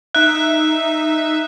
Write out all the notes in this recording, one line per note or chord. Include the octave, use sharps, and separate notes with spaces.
D#4 E5 F#6